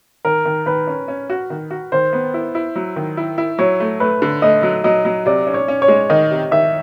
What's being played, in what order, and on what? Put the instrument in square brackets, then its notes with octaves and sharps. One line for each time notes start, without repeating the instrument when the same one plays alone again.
[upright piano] D#3 [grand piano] A#4
[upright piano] D#3
[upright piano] D#3 [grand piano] B4
[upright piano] C#4
C#4
F#4
D#3
F#4
[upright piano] D#3 [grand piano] C5
[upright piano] B3
E4
E4
F#3
D#3
E4
E4
[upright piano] F#3 [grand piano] C#5
[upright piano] A3
[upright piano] A3 [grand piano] B4
[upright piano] D3
[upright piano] A3 [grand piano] D#5
[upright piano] F#3
[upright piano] F#3 [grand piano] D#5
[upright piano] F#3
[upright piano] C3 [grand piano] D5
[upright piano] C#4
[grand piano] C#5
[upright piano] C#4
[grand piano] C#5
[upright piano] G#3
[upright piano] D#3 [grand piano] D#5
[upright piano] C3
[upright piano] D#3 [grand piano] E5